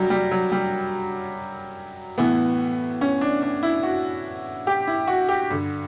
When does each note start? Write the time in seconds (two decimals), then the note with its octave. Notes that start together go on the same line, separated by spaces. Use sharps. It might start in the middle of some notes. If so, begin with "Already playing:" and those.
Already playing: F#2 F#3 G3
0.10 G3
0.31 F#3
0.52 G3
2.18 A2 E3 B3
3.01 C#4
3.21 D4
3.42 D4
3.63 E4
3.83 F#4
4.67 G4
4.87 E4
5.07 F#4
5.29 G4
5.50 G2 D3